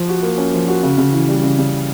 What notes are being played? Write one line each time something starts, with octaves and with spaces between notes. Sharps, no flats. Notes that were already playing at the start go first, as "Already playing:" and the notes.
Already playing: F3
F#4
A#3
C#4
F3
F#4
C#3
C#3
E3
G3
C#3
C#3